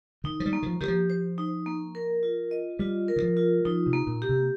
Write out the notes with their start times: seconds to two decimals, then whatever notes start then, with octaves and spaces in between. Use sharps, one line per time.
0.24 D#3 D#4
0.40 F3
0.46 G3
0.53 A#3
0.63 D#3
0.66 F3
0.81 D#3 G4
0.88 F3
1.10 C5
1.38 D#4
1.66 A#3
1.95 A#4
2.23 F4
2.51 D#5
2.79 G3 F4
3.08 A#4
3.16 D#3
3.22 F3
3.37 F4
3.65 F3 D#4
3.86 C3
3.93 A#3
4.07 A#2
4.22 G4
4.29 C3